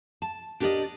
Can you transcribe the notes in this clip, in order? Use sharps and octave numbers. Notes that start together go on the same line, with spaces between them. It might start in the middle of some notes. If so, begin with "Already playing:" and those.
A5
D4 G4 A#4 B4 D5 D#5